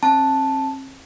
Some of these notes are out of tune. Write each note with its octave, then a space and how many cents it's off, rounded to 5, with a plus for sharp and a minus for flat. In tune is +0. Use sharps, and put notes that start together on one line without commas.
C4 +45 A5 +0